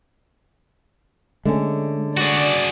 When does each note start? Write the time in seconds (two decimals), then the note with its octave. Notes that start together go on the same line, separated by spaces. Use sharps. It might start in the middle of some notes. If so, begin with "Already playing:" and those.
1.45 D3 G#3 A3 C#4
2.17 F#4 G#4 D5